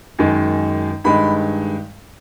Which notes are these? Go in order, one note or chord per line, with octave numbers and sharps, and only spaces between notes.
F#2 D#3 G#3
G2 D#3 G#3 B5